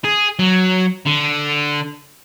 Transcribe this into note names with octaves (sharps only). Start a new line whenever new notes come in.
G#4
F#3
D3